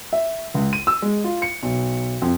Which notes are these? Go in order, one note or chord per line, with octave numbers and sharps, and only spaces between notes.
E5
C#2
D#7
E6
G#3
F4
C#7
B1
F2